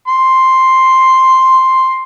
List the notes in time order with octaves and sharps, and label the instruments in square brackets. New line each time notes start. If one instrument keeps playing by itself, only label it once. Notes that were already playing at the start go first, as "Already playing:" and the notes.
[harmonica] C6